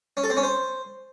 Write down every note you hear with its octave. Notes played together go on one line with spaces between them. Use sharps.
C#4
A4
C4
C#4
C5